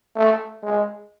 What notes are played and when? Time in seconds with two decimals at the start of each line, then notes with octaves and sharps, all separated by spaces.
0.16 A3
0.63 G#3